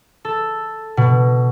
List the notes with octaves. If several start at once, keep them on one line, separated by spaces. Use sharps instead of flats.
A4
B2